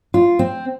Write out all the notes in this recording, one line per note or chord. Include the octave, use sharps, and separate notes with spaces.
F4
C4